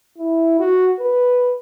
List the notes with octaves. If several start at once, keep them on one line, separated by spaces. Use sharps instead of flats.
E4
F#4
B4